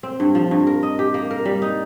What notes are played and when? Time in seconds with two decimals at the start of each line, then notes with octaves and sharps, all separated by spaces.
0.03 C4
0.20 G2
0.35 F3
0.51 G2
0.67 A#4
0.83 D#5
0.99 G4
1.14 A#3
1.31 A#4
1.45 G3
1.62 D#4